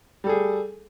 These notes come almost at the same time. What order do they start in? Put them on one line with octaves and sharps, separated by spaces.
G3 A4 G#4